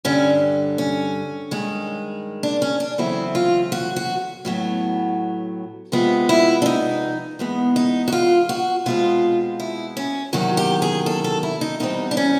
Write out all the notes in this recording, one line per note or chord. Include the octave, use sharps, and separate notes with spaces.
G2 D3 G3 C#4
C#4
G2 D#3 G#3
D4
C#4
D4
E2 C#3 F#3 A3 C4 E4
F4
F#4
F#4
A2 F#3 B3
C3 F3 G#3 B3
E4
D4
D#4
E2 B2 G#3 B3
D#4
F#4
F4
F#4
B2 G#3 C4 F4
E4
C#4
E2 C3 D#3 F#3 F#4
G4
G#4
A4
A4
E4
D#4
E2 B2 G3 C4 D#4
D4
C#4